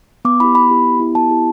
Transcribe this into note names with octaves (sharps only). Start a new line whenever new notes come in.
B3 D6
E4 G4 B5
B3 B5
E4 G4
B3
E4 G4
B3 A5
E4 G4